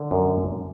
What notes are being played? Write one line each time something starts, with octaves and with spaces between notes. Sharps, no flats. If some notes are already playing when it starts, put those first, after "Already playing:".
Already playing: D3
F#2